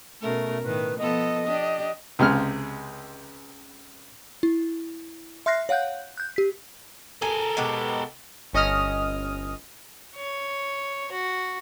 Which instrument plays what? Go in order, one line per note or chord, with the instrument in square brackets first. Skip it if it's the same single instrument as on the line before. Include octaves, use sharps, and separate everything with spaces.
[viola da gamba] B2 C#4 A#4 [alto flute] A3
[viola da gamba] A2 D#3 [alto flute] B4
[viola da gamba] F3 B3 A4 [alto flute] D#5
[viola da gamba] D4 G4
[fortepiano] C#2 C3 G#3 F6
[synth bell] E4
E5 C6 F6 F#6 A#6 C7
C#5 F5 F#5 F#6 G6
F#6 G6
G4 B6
[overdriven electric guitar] A4 A#4 [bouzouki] G#5
[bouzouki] B2 G#3 G4
[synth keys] G1 C#4 D#5 D#6 F6
[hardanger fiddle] C#5
F#4